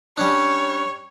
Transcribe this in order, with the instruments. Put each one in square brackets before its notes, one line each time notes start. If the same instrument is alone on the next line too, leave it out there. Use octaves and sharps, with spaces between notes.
[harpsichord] G3 C#4 D4 [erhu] C#5